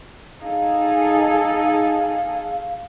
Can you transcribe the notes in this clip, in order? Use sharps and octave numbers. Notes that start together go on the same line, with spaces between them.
D#4 G#4 A4 F5